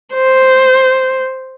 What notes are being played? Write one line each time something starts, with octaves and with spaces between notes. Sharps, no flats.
C5